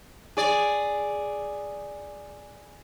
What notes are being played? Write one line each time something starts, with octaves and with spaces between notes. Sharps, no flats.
G#4 D5